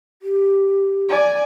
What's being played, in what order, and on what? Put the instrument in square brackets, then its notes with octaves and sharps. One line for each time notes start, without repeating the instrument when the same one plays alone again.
[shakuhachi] G4
[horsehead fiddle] D5 G#5